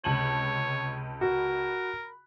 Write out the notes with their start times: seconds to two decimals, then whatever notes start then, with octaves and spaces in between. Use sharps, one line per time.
0.04 C#2 C3 C#5 A5 D#7 F#7
1.21 F#4 A#4 B5